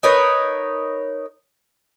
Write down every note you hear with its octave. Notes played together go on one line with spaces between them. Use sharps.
D#4 A#4 B4 C#5